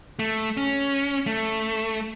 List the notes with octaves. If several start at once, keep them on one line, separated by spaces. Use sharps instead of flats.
A3
C#4
A3